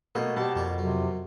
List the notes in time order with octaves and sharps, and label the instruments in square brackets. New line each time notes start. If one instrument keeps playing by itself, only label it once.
[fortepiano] B2 A3 A#3 [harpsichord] G#4 C#5 D#5
[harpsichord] G#2 D3 [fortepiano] B2 [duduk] G4 [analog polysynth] A5
[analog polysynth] F2 [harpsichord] A#3 C#5 D5
[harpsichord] F#2 F#3 [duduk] C3